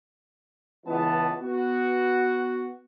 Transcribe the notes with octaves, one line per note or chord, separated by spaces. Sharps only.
C#2 E3 B3 A5
B3 F#4